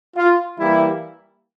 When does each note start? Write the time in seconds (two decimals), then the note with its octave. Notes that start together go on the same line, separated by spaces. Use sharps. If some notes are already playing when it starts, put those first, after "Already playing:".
0.17 F4
0.58 E3 G3 A#3 E4